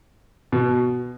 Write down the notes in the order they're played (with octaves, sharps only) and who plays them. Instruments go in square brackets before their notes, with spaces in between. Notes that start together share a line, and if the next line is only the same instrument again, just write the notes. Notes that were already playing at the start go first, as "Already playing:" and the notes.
[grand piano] B2